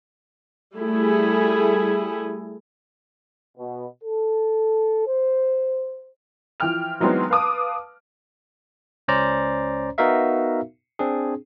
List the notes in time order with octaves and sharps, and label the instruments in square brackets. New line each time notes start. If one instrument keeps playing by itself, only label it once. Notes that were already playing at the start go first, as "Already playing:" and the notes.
[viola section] G3 A3 E4 G#4
[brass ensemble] B2
A4
C5
[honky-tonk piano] E3 F3 G5 F6 F7
E3 F#3 G#3 B3 C4 D#4
B4 F5 A5 D6 D#6
[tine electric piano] C#2 C#4 C5 D5 A#5
B3 D#4 F#4 A#4 E5 F5
C4 D4 G#4